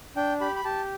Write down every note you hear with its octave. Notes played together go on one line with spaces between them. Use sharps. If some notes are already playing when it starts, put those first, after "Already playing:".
D4 G5
G4 B5
B5
G4 A5